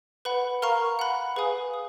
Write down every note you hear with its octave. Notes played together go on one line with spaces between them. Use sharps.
B4 F#5 B5
A#4 F5 A#5 C#6 F6
F#5 B5 F#6
G#4 B4 F5 G#5 D#6
D#6 F#6